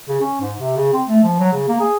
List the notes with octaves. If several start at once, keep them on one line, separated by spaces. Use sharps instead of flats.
C#3
C#4
G#2
C3
C#3
C4
A3
F3
F#3
C#3
A#3
G#4